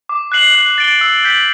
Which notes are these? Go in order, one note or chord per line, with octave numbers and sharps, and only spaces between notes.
D6
F#6 C7 F#7
F#6
A6 D7 G7
E6
G6 B6 F#7